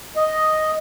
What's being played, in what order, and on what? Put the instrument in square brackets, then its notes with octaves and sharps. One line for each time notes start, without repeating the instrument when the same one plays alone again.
[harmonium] D#5